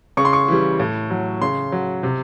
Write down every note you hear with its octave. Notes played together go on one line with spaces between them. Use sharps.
C#3 C#6
C6
C#6
E3 G3
A2
F#3
C#3 C6
F#3
C3